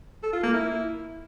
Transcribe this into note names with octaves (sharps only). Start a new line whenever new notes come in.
A4
F4
A#3
E4